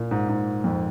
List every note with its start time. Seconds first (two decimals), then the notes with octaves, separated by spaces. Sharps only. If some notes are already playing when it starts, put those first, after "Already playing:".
Already playing: A#2
0.11 G#2
0.29 G#2
0.64 F2